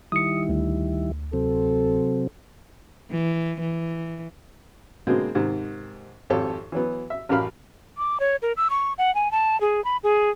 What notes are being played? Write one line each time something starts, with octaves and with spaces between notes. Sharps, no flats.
D#3 G3 E4 D#6 C#7
D2
C3 F#3 C4 A4
E3
E3
B2 D3 G#3 A#3 C4
G#2 C3 D#3
G#1 F2 G4 A4 C#5 C#6
E3 F#3 B3
E5
A1 F#2 G4 A#4 F5 B5
D6
C#5
A#4
E6
C#6
F#5
G#5
A5
G#4
B5
G#4